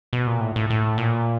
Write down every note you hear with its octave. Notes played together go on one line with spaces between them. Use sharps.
B2
A#2
A2
A2
A2
A#2